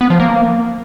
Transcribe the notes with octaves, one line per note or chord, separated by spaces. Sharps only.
B3
F3
A#3